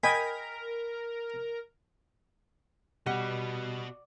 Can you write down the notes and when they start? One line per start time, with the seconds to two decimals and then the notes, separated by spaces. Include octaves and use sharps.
0.03 A#4 D#5 G5 G#5 B5
3.06 B2 G3 B3 F#4 D#5 F#5